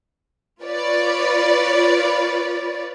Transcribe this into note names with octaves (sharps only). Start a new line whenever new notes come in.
F4 B4 C#5 D5